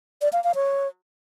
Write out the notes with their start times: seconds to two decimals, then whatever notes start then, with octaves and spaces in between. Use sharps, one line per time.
0.22 D5
0.33 F5
0.44 F5
0.55 C#5